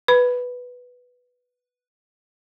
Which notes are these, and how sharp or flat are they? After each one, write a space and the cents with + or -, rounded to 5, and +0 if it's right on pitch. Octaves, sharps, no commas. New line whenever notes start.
B4 +0 B5 +0